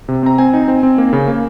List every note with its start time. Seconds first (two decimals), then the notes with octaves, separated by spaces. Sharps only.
0.08 C3
0.23 C4 A#5
0.38 C4 G#5
0.53 D#4
0.68 C4
0.83 C4
0.98 A#3
1.13 C#3
1.28 A#3